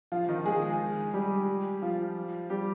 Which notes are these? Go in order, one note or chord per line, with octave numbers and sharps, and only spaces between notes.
F3 F4
D#3 D#4
G#3 G#4
G3 G4
F3 F4
G3 G4